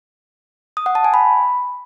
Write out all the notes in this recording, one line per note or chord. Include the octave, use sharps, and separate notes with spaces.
D#6
F#5
A5
G#5
B5